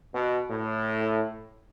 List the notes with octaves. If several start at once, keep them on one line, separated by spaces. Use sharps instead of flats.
B2
A2